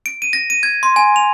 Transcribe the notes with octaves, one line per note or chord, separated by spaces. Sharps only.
D7
D#7
A#6
D#7
G#6
C6
G#5
F7